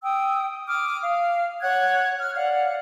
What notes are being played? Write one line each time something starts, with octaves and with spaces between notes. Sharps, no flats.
G5 D#6 E6
D6 D#6 F6
F5
C#5 F#5 F#6 G#6
F6
D5 F5 F#5